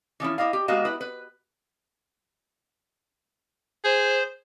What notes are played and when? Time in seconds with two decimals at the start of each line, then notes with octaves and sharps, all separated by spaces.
0.20 E3 F3 C#4 E4
0.38 E4 G4 D#5 F5
0.53 G4
0.68 G#3 A#3 B3 F#4 D#5 F5
0.85 E4 B4
1.01 B4
3.84 G#4 C5